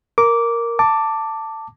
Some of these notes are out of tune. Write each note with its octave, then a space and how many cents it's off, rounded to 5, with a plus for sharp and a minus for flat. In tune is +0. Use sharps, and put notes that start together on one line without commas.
A#4 +0 D6 -10
A5 +15 D6 +0